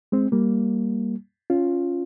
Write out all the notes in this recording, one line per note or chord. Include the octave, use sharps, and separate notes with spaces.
G#3 C4
G3 A#3
C#4 F4